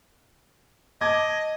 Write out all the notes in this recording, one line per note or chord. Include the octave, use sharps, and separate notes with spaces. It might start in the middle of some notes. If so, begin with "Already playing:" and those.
D#5 A5 D6 G#6